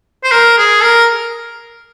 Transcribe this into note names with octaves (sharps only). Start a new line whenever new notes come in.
C5
A#4
G#4
A#4